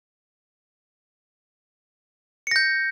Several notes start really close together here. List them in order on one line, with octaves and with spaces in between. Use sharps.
C#7 A#6 G6